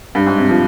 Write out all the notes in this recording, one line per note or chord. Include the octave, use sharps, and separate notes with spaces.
G2
G#2
C3
F3